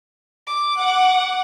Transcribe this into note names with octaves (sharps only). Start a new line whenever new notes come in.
D6
F#5